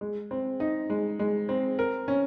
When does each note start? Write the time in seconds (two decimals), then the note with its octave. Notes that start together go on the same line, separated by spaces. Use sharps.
0.01 G#3
0.31 C4
0.60 D#4
0.90 G#3
1.19 G#3
1.49 C4
1.79 A#4
2.08 C#4